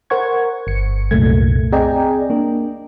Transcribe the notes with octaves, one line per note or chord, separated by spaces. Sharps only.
A#4 C5 F#5 C#6 G#6
G1 C#7
C2 F#2 A#2 A3 A#3 G#6
C4 G#4 D5 D#5 G5 A#5
A#3 D4